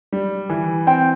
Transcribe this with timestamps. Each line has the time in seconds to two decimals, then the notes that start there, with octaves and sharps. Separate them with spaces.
0.12 G3
0.50 E3
0.87 C4 G5